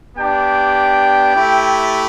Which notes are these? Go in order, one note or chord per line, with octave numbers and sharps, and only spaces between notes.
B3 D4 G4 G5
A3 E4 G4